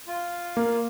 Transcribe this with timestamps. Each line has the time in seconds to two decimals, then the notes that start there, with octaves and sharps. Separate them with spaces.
0.07 F4
0.57 A#3